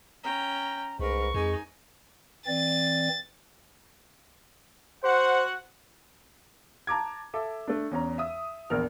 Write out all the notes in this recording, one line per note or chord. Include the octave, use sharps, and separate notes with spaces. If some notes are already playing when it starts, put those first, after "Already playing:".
C#4 G5 A#5
C2 G#2 A#4 B4 C#6
F2 G#3 D#4 G#5
E3 C4 D5 A6
F#4 C5 F#5
A5 A#5 D6 G#6
A4 E5 D6
A3 D4
E2 C#4 A#5
E5 D#6
A#1 E2 A#4 F6